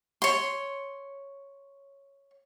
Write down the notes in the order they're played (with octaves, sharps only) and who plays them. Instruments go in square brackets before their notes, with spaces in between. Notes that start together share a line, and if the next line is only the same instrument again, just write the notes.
[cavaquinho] C#5 C6